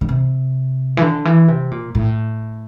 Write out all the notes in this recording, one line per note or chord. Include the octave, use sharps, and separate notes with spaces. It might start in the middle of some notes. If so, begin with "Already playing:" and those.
D3
C3
E3
D3
E3
C3
A#2
A2